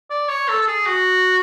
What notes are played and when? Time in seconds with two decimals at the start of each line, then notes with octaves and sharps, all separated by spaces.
0.10 D5
0.29 C#5
0.48 A4
0.61 A4
0.67 G#4
0.86 F#4